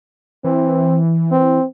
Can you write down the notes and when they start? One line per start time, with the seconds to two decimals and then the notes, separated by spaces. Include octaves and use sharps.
0.44 E3 C4
1.31 C4